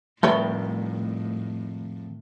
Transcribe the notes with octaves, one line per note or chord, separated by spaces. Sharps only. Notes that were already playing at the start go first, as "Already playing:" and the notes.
F2 A2 D#3 G3 A3 B4 C#5 G5